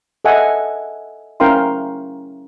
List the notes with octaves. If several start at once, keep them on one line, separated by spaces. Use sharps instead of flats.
A4 D#5 E5 F#5 G#5 A5
C#4 E4 A#4 F5 G5 C6